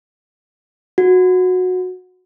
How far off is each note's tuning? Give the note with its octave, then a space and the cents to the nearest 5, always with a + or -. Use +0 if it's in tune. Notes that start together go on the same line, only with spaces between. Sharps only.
F#4 -15